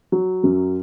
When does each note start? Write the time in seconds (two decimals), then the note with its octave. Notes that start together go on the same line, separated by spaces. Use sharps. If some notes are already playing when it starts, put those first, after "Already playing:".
0.12 F#3
0.44 F#2